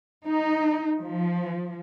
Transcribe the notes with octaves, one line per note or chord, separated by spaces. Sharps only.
D#4
F3